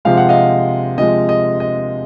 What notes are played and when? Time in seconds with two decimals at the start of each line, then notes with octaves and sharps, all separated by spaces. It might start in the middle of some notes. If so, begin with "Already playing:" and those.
0.05 C3 F3 G#3 F5
0.17 F#5
0.29 D#5 F5
0.98 C3 F3 G#3 D#5
1.29 D#5
1.60 D#5